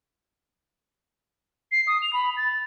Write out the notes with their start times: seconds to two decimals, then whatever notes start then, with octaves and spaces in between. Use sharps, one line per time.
1.72 C7
1.87 D#6
2.02 F7
2.13 B5
2.37 A6